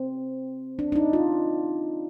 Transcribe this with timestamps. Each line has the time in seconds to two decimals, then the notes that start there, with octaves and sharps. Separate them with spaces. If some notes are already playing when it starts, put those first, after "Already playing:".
Already playing: C4
0.79 D4
0.92 D4
0.96 D#4
1.13 F4